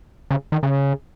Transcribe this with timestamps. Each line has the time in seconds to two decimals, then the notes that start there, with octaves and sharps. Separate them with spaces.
0.31 C#3
0.52 D#3
0.63 C#3